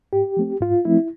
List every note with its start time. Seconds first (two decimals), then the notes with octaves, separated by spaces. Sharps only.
0.13 G#2 G4
0.37 F3 A3 C4
0.61 G#2 F4
0.85 F3 A3 C4 E4